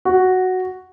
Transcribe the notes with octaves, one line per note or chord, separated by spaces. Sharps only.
F#4